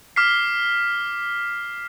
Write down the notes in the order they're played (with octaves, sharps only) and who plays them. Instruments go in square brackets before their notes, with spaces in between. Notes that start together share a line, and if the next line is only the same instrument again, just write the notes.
[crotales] D6 F6 B6 C7